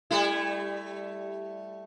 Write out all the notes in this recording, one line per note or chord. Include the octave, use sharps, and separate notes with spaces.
G3 A3 E4